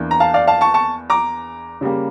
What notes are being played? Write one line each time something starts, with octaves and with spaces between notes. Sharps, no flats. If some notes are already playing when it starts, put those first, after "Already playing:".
Already playing: E2 E3 A#3 D4
A#5
F5 A5
D5 F5
F5 A5
A5 C#6
A5 C#6
A#5 D6
C#3 G3 A#3